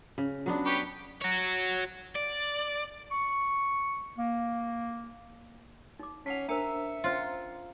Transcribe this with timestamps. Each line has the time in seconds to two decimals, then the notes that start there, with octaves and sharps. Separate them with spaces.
0.18 C#3
0.46 F#3 B3 D4
0.66 G4 B4 C#5
1.22 F#4 C#5
2.16 D5
3.11 C#6
4.18 A#3
5.99 D#4 D6
6.26 C#4 F#5 A5 B6 C7 F7
6.49 D4 A#4 C5 E5 A#5 E6 C#7
7.04 C#4 F4 C5 C6